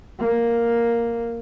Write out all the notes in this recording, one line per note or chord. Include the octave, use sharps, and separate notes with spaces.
A#3